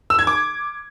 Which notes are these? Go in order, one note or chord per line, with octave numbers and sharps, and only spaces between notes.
E6
G#6
D6